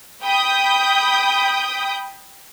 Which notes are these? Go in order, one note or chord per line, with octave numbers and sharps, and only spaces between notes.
G5 B5 D#6 G6